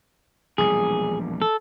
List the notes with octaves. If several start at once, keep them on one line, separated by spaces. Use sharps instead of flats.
E1 A#1 G3 G#4
A4